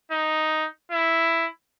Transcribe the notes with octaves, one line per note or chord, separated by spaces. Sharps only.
D#4
E4